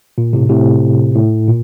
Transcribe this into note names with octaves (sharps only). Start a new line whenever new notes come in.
A#2
A2 C3
A2 C3
A2
A#2